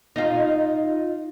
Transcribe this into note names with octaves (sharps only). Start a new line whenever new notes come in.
D#4 F4